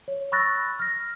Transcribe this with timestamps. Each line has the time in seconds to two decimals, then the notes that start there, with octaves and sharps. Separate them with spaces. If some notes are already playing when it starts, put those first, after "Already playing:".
0.08 C#5
0.32 B5 C#6 E6 F#6 A6 A#6
0.79 F6 A#6